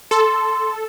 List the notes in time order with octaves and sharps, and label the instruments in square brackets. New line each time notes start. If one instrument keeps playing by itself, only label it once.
[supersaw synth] A4 [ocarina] C6